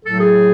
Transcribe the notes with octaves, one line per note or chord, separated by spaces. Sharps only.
A2 F#3 A3 A4
G#4